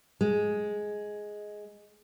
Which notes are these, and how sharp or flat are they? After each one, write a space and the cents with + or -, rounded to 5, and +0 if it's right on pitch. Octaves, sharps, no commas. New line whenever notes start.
G#3 +5